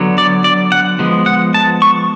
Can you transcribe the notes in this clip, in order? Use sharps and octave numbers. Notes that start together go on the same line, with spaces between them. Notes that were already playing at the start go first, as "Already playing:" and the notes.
Already playing: D3 F#3 B3
D5
D5
F#5
F3 G#3 B3
F#5
A5
C#6